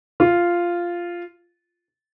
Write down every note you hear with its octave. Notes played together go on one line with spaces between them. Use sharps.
F4